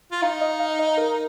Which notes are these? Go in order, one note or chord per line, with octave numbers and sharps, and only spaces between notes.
F4
D#4 F5
D#5
F5
D#5
A#4